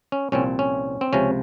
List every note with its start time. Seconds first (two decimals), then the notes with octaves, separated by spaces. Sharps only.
0.12 C#4
0.32 C2 A#2 F3 C4 C#4
0.59 C#4
1.01 C4
1.13 C#2 C3 F3 C#4